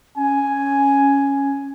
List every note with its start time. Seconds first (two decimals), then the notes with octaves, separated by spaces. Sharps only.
0.17 C#4 G#5